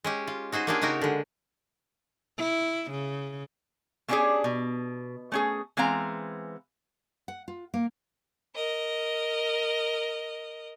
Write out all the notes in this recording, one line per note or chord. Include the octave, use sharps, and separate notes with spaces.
G#3 C#4 G4
F4
D#4 F#4 G#4 C5
A#3 C#4 D4 F4 G4 G#4
C#3 D#4 F#4 G4 A#4
D3 G#3
E4
C#3
A3 A#3 C#4 D4 G4 G#4
B2
A3 C#4 G#4
E3 G#3 B3 C4 F5 A#5
F#5
F4
A#3
A#4 D#5